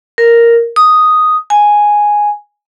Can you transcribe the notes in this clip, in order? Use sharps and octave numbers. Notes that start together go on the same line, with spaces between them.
A#4
D#6
G#5